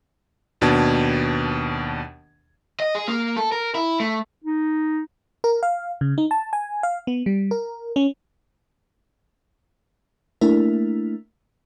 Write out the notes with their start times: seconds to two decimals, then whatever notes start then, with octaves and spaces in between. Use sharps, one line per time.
0.61 D#2 B2 D4 A5 G#6
2.80 D#5
2.95 G#4
3.08 A#3
3.37 A4
3.52 A#4
3.75 E4
4.00 A3
4.44 D#4
5.44 A#4
5.63 F5
6.01 C#3
6.18 D#4
6.31 A5
6.53 G#5
6.83 F5
7.07 B3
7.26 G3
7.51 A#4
7.96 C#4
10.41 A3 A#3 D4 E4 A#4